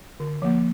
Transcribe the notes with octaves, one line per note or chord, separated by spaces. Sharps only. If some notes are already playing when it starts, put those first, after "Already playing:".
D3
F3 A#3